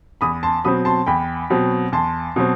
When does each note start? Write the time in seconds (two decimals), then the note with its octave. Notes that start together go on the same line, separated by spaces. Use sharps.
0.21 E2 B5 D#6
0.43 A5 C6
0.64 B2 F#3 C4 B5 D#6
0.85 A5 C6
1.07 E2 G5 B5
1.50 B2 F#3 C4
1.92 E2 A5 C6
2.36 B2 F#3 C4